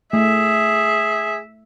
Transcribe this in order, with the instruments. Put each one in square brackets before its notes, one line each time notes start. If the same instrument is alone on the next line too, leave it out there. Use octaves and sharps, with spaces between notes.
[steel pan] A3 [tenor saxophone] G#4 [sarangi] E5